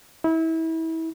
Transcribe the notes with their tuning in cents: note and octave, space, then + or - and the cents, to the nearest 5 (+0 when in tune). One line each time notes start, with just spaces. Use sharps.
E4 -30